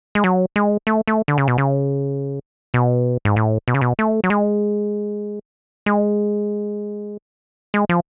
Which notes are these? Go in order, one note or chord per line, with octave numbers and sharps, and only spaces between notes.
G#3
F#3
G#3
A3
A3
D3
C#3
B2
C#3
B2
G#2
A2
B2
C#3
B2
A3
F#3
G#3
G#3
G#3
F3